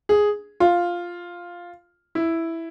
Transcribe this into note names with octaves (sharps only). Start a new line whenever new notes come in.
G#4
F4
E4